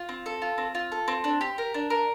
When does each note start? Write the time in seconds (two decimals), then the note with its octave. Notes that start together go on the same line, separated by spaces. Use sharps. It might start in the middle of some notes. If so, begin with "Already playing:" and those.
Already playing: F4
0.09 C4
0.26 A4
0.42 F4
0.58 C4
0.75 F4
0.92 A4
1.08 C4
1.24 D4
1.41 G4
1.58 A#4
1.74 D4
1.90 A#4